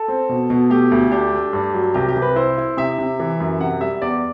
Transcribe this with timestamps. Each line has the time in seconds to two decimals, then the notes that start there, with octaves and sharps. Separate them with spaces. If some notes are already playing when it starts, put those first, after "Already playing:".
Already playing: A4
0.08 C4
0.29 B2
0.50 B2
0.70 A3 G4
0.92 D2
1.12 D4 G4
1.33 A3
1.53 G2
1.74 F#3
1.94 C2 G4
2.09 G4
2.16 C2
2.22 B4
2.36 E4 C5
2.57 E4
2.77 C3 E5
2.98 C3
3.20 E3
3.40 F#2
3.60 C3 F#5
3.81 G3 E5
4.02 E2 D5